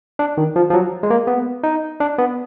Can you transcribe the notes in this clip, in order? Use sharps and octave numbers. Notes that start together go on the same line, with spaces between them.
D4
D#3
F3
F3
F#3
G#3
A#3
B3
D#4
D4
B3